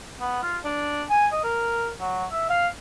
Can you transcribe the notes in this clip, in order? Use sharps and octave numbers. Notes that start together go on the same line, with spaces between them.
B3
F4
D4
G#5
D#5
A#4
F#3
E5
F5